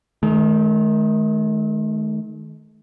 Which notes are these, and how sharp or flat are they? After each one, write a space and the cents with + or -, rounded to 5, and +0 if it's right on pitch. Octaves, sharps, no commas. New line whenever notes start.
D#3 +0 A3 -45